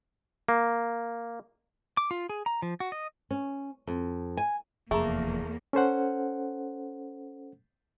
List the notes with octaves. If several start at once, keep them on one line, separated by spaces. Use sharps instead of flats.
A#3
D6
F4
G#4
A#5
F3
F#4
D#5
C#4
F2
G#5
F1 E2 F3 A3 A#3 G#4 A#5
C#4 A4 C5 F#5